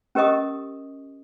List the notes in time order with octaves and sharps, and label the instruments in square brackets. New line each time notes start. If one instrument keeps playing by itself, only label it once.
[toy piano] C#4 G4 A#4 D#5 C#6 D#6